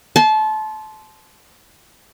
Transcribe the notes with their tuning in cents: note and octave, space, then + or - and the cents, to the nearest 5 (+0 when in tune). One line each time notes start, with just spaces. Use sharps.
A5 -25 C6 +0